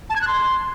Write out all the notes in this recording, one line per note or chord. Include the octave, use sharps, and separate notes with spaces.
A5
G#6
F#6
C6